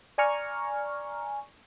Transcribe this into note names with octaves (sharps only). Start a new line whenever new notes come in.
D5 G#5 A#5 C#6 F6